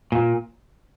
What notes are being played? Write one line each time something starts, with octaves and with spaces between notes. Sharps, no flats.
A#2